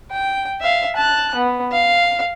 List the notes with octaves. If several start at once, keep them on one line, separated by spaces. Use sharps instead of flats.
G5
E5 F5
A5 F#6
B3
F5